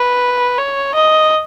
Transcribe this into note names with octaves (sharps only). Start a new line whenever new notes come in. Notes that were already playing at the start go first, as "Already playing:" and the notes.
Already playing: B4
C#5
D#5